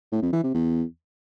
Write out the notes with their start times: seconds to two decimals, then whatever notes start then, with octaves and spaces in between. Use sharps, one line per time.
0.12 A2
0.22 F2
0.33 E3
0.44 C3
0.54 E2